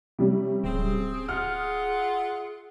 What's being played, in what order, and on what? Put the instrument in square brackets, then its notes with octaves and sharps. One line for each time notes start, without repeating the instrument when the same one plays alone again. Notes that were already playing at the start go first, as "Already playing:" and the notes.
[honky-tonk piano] C3 G3 C#4
[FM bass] D1 [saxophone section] C4 [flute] G#4
[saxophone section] F4 E5 F#5 [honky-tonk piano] F6